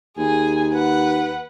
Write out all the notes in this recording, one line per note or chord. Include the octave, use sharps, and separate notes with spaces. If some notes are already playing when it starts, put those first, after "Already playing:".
D#2 G#4 G#5
B4 F#5